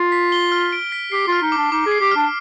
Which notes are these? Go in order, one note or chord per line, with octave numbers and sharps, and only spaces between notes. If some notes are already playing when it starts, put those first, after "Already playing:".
Already playing: F4
B6
G7
F6
D7
B6
G4 C7
F4 F6
D#4
D6
D4
D#4 D6
G#4
C7
G4
D4 F6